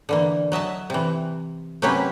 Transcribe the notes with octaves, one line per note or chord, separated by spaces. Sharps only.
D3 E3 A#3
F#3 D#5 E5 A5
C3 E3
C3 F#3 A#3 C#4 G4 B4